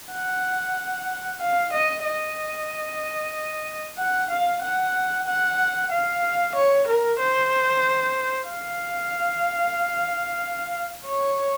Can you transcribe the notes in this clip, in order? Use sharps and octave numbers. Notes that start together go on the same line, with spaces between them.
F#5
F5
D#5
D#5
F#5
F5
F#5
F#5
F5
C#5
A#4
C5
F5
C#5